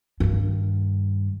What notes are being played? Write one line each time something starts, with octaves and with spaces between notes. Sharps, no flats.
G2 D#3